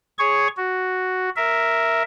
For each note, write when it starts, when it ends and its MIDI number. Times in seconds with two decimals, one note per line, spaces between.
0.19 0.48 68
0.19 0.48 73
0.19 0.48 85
0.57 1.29 66
1.36 2.03 70
1.36 2.03 76